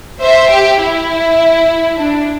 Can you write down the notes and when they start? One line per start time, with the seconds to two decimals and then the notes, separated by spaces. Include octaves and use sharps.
0.21 C5 E5
0.50 G4
0.80 E4
1.98 D4